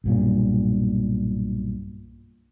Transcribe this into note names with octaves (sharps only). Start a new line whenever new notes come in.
B1 G2 A#2